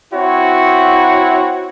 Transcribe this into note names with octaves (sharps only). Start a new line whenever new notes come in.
C4 E4 F#4 C#5